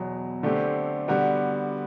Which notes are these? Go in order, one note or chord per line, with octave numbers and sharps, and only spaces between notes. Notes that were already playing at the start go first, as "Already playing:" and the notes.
Already playing: E2 B2 F#3
D3 A3 C4 G4
D3 G3 B3 F#4